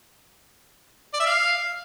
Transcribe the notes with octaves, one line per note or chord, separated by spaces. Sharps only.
D5
E5
F5